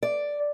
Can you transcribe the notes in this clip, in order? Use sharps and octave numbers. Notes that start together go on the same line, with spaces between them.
D5